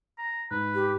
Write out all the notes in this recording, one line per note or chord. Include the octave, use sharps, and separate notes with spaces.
A#5
G#2 B4
G4